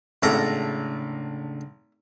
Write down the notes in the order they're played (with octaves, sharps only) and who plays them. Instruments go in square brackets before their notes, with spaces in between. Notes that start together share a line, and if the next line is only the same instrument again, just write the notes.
[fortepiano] G#1 [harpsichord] A2 A4 A#5 [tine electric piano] C#3 D4